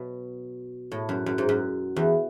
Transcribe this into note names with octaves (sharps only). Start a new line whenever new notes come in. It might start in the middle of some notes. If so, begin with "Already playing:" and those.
Already playing: B2 F#3
A2
F#2
F#2
G#2
F#2
E2